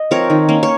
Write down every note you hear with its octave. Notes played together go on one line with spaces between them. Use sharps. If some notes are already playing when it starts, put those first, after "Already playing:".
Already playing: D#5
F3 C4 A#4 C#5
D#3
A#3 C#4
C#5